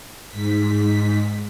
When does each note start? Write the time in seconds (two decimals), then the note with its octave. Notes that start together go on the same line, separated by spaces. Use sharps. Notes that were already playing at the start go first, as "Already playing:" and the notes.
0.28 G#2 B6